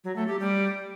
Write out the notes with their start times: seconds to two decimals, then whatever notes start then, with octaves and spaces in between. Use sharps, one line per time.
0.04 F#3
0.16 A3
0.28 G4
0.40 G3